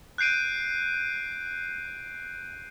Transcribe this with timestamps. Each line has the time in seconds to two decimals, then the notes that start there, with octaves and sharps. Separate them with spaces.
0.18 F#6 G6 C7 D7 D#7